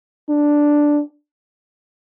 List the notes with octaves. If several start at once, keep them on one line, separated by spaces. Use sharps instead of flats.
D4